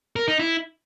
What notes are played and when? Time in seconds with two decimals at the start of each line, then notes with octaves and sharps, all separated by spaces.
0.16 A#4
0.28 D#4
0.39 E4